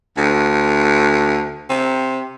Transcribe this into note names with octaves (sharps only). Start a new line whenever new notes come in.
D2
C3